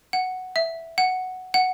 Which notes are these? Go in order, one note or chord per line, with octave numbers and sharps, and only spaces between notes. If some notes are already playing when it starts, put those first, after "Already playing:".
F#5
E5
F#5
F#5